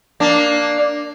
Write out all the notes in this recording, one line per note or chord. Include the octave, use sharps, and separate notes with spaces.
A#3 D4